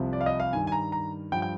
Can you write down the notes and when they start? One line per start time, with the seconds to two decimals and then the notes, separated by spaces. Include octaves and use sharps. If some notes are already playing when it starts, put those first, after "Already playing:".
Already playing: C2 C3 F3
0.13 D5
0.21 F5
0.26 D#5
0.40 F5
0.53 G2 D#3 G#5
0.67 G#5
0.72 A#5
0.92 A#5
1.32 G2 F3 G5
1.42 G5